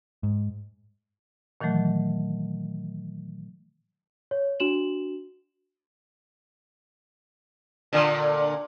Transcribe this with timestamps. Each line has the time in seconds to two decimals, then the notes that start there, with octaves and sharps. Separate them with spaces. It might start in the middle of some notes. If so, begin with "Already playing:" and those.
0.23 G#2
1.61 A#2 D#3 E3 F#3 A3
4.31 C#5
4.60 D4 F#4 E7 F#7
7.93 A#2 D3